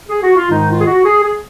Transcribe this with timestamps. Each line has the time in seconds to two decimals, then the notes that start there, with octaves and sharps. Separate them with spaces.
0.09 G#4
0.23 F#4
0.36 F4
0.50 G#2 D#3 G#3 D#4
0.69 F4
0.81 G#4
0.87 F#4
1.05 G#4
1.24 G#4